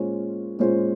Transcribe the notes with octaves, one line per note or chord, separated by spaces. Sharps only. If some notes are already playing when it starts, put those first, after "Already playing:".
Already playing: A#2 G#3 C#4 F4 C5
A#2 G#3 C#4 F4 C5